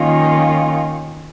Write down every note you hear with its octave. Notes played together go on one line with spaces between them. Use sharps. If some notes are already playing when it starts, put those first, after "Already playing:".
Already playing: D#3 A#3 C#4 F4